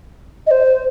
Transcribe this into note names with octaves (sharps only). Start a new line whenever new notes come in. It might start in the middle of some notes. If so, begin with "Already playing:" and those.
D#5
C5